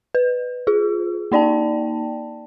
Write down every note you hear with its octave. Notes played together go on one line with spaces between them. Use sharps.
B4
F4 G#4
A#3 D#4 D5 G5 A5